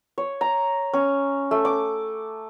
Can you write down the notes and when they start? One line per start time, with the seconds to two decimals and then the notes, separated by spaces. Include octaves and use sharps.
0.18 C#5
0.41 A#5
0.93 C#4
1.51 A3
1.65 D6